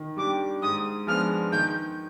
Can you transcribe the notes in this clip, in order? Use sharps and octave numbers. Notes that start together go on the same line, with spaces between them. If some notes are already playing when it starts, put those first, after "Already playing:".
Already playing: D#3
G3 D4 G4 D6
G#2 D#6
F3 G#3 B3 D4 F6
D#3 G6